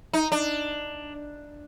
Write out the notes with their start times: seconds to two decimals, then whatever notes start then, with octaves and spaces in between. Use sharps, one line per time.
0.13 D#4
0.32 D4